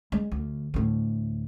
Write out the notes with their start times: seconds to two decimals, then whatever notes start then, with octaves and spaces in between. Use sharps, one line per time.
0.12 G#3
0.32 D2
0.74 D2 A2